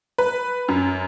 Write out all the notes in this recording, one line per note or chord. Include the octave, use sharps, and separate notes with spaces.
B4
F#2